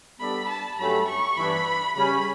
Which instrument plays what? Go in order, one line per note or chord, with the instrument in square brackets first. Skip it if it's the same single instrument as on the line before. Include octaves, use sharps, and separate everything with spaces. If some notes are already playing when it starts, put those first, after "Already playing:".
[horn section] G3 B3 D4 A4 D5 [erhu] B5
[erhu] A5
[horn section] G2 F#3 A3 C#4 G4 [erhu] B5
[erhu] C#6
[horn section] G2 E3 B3 D4 [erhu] B5
[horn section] C#3 G3 C#4 [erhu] B5